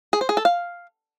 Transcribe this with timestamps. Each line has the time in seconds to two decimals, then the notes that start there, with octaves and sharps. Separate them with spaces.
0.13 G#4
0.21 C5
0.29 G#4
0.37 A4
0.45 F5